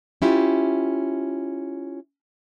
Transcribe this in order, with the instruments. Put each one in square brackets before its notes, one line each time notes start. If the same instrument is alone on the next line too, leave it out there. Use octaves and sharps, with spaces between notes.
[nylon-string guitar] C#4 E4 F4 G4